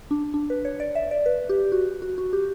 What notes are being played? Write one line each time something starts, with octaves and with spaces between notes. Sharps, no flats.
D4
D4
B4
C#5
D5
E5
D5
B4
G4
F#4
F#4
F#4
G4